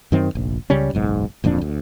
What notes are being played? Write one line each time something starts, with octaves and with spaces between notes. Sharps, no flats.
F#2 D#3 C4
F1 A#1
C#2 C#3 G3 C#4
F#1 B1 G#2
D1 F2 A#2 D4
D2